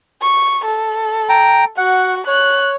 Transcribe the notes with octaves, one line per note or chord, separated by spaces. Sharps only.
C#6
A4
G5 A#5
F#4 F#5
C#5 F#6